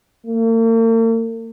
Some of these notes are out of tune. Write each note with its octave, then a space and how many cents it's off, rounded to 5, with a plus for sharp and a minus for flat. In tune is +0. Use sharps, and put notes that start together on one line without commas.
A#3 -45